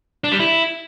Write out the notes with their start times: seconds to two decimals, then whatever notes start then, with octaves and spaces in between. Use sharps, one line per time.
0.24 D4
0.32 G3
0.40 E4